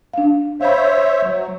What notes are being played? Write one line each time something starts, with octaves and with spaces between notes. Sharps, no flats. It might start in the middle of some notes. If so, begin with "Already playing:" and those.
D4 F5
C5 C#5 E5 F5 B5
F#3